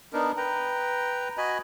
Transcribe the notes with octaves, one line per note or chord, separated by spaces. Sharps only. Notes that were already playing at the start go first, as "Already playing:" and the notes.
B3 D4 D#4 A#4
B4 G5 A#5
F#4 D#5 G#5 B5